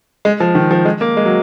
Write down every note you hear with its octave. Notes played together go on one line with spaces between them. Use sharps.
G#3
F3
D#3
F3
G#3
A#3
G#3
F#3